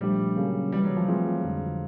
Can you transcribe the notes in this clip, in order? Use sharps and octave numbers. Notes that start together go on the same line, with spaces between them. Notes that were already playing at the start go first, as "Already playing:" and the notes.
A#2 F3 G3 A3 D4 G4
C#3 F#3 A#3
C3 E3 G3 G#3
F#3
F3
E3 A3 C4 F4 G#4
F2 D3 F3 G#3